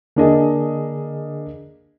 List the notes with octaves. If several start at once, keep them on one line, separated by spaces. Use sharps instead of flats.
D3 A#3 D4 G#4 D#5